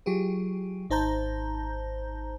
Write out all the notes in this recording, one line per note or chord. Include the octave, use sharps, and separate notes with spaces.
F#3 F4 G4 G#4
G#1 D#4 C5 A5 A#5 G6